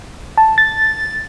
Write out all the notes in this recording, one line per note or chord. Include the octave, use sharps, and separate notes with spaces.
A5
A6